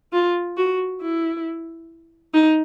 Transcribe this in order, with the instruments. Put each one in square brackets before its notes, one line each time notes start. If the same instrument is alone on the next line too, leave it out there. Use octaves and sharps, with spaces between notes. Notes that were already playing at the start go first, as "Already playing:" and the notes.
[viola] F4
F#4
E4
D#4